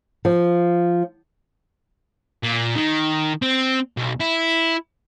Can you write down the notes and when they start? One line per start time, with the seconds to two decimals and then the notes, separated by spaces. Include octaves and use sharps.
0.25 F3
2.43 A#2
2.75 D#3
3.42 C4
3.97 B1
4.20 E4